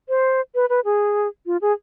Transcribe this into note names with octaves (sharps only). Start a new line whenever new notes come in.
C5
B4
B4
G#4
F4
G#4